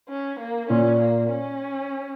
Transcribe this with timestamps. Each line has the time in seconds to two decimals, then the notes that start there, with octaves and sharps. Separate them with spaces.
0.09 C#4
0.40 A#3
0.70 A#2 C#4
1.00 A#3
1.30 C#4